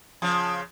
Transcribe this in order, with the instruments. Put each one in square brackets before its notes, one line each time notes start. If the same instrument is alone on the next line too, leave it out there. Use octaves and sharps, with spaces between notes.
[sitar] C#3 F3